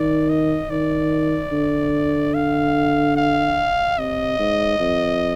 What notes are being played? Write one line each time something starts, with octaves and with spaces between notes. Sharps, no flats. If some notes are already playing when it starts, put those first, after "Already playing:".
Already playing: D#3 D5
D#5
D#3 D5
D3
F5
F5
C3 D#5
G#2
F2